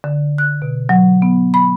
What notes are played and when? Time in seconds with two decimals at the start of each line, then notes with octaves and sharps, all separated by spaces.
0.04 D3
0.38 F#6
0.62 B2
0.89 F#3
1.22 B3
1.54 B5